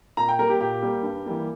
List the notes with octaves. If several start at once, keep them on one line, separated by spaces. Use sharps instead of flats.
A#2 A#5
G5
G3 A#3 A#4
G4
A#2 G4
G3 A#3
G2
E3 G3 A#3